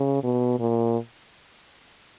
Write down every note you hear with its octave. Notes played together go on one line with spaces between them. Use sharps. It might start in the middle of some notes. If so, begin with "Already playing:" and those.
Already playing: C#3
B2
A#2